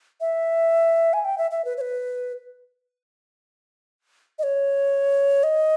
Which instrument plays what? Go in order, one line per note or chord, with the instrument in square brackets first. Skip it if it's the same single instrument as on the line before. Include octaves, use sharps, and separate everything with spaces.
[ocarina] E5
G#5
G5
E5
E5
B4
C#5
B4
D#5
C#5
D#5